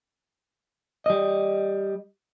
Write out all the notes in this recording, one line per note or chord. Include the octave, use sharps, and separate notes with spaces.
G3 D#5